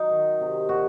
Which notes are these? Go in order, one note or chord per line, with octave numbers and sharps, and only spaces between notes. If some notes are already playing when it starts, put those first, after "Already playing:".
Already playing: F#3 D#4
D#3
C3
A#2 F#4